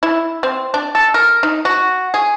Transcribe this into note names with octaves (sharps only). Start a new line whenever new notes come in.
E4
C4
D4
A4
A#4
D#4
F#4
G#4